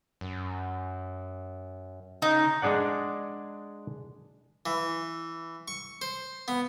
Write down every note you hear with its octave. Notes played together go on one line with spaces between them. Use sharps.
F#2
C#3 D#4
G#3 D4 G#4 D5 F#5
E3
C#6
C5
B3